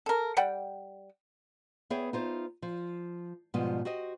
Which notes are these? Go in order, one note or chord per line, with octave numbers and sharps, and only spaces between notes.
A4 A#4
G3 F#5 G5
B3 G#4 C#5 E5 G5
D#4 F4 C5
F3
G#2 B2 F3 G3 B3 D#5
F#4 G4 C5 D#5